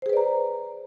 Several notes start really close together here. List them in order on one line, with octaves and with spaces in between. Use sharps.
C5 G#4 B4 D5 A#5